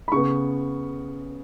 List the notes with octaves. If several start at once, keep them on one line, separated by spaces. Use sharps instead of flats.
B5
C#3 B3 C#6